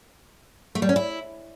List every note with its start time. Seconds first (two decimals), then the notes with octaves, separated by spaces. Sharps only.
0.75 A3
0.82 G3
0.89 C#4
0.96 E4